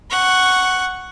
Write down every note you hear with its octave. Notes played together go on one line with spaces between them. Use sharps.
F#5 C#6